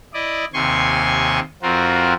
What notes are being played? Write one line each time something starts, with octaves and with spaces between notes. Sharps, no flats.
E4 D5 D#5
D#2 C3 G#5 C6 C#6
F2 C4 F4 F#4 A#4